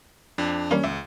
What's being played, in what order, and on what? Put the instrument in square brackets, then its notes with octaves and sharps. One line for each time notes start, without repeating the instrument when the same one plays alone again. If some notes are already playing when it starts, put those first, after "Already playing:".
[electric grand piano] F2 D4
[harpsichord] G3 A#3 F4 [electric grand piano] C#4
[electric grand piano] C#2 [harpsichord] E5